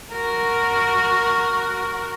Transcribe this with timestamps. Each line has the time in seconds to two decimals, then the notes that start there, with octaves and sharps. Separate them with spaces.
0.13 F#4 A#4